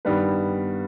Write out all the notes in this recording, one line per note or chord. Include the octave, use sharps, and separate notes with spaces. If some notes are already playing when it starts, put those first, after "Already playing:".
G2 D#3 G3 B3 B4